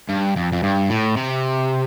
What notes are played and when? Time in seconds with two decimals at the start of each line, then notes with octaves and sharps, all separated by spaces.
0.09 G2
0.36 F2
0.52 F2
0.63 G2
0.90 A2
1.17 C3